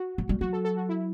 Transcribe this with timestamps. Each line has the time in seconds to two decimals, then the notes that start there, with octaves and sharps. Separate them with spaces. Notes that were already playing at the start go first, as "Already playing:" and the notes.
Already playing: F#4
0.18 F#3
0.29 G3
0.41 F#3 F#4
0.53 A4
0.65 A4
0.77 F#4
0.89 E4